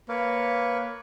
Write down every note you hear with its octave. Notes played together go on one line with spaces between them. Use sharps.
A#3 B4 C#5